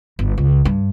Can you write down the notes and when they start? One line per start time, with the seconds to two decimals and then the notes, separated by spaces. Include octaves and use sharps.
0.19 G1
0.38 C#2
0.65 G2